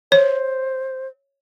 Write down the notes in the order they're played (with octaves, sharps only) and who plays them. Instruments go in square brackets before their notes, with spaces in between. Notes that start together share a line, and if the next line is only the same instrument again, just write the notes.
[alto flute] C5 [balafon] C#5